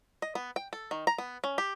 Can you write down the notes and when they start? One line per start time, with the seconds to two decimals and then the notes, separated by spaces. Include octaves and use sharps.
0.22 D#5
0.35 B3
0.56 G5
0.73 A4
0.91 D#3
1.07 A#5
1.18 B3
1.44 C#4
1.58 G4